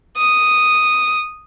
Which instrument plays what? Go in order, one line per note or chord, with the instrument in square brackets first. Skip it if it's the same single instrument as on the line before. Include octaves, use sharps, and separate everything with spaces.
[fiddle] D#6